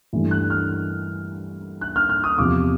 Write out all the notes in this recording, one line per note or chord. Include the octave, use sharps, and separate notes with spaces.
G2 E3 A3
F#6
F6
F#6
F6
F6
D#6
E2 C3 F3 D6